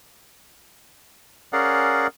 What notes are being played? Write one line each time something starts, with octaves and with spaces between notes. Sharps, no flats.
C#4 G#4 A#4 D5 F5 F#5